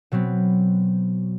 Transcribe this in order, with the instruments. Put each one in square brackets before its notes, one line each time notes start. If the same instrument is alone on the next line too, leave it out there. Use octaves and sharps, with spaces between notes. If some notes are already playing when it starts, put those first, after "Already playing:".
[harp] B2 F#3 B3 C4